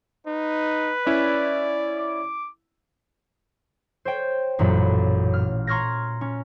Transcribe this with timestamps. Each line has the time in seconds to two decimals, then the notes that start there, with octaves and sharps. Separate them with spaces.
0.27 D#4 B4
1.07 C#4 E4 D5
1.97 D6
4.05 C5 C#5 G5
4.59 A1 F#2 A#2 F#3 B5
5.34 F6
5.67 A#5 C6 C#6 F6 G#6 A#6
6.21 C#4